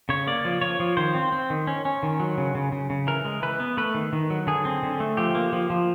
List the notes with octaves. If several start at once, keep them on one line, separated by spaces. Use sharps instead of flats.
C#3 C#5
A#3 D5
F3
F3 C#5
F3
D#3 C5
C4
C4
D#3
C#4
C#4
D#3
F#3
C#3
C#3
C#3
C#3
E3 A#4
G#3
E3 B4
B3
A3 B4
D#3
D#3
F#3
D3 G#4
C4
D3
A3
F3 G4
A#3
F3
F3